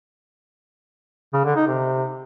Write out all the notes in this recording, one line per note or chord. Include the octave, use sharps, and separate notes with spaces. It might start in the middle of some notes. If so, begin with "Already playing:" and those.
C#3
D3
D#4
C3